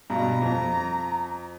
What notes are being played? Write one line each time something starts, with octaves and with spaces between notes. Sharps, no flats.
G2 B2 A#5
F2